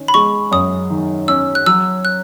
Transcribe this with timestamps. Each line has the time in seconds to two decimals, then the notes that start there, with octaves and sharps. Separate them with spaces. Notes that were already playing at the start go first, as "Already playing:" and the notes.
Already playing: D#3 C#4
0.08 B5
0.14 G#3 C#6
0.51 F#2 D#6
0.90 D#3
1.28 C#4 E6
1.55 F#6
1.66 F#3 E6
2.05 F#6